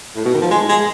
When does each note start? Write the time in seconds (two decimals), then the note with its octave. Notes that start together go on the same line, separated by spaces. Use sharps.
0.16 A2
0.25 B2
0.34 D#3
0.42 F3
0.51 G#3
0.69 G#3